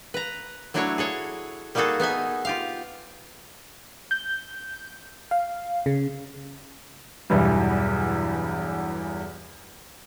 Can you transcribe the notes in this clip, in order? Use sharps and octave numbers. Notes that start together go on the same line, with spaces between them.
B4 A#5
F#3 A3 D4 E4 F#4 C#5
G#4 A4 C#5
G3 A#3 D#4 F#4 G#4 A4
B3 D#4 E5 G#5
F4 G4 F5
G6
F5
C#3
B1 E2 G2 E3 G3